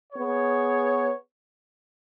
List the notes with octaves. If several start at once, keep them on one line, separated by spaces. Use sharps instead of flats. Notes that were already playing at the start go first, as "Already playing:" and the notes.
B3 G#4 C#5